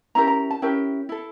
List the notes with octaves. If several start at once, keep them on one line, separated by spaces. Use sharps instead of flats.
C#4 E4 G4 A#4 A#5
A#5
A5
C#4 E4 G4 A#4 G5
E4 A4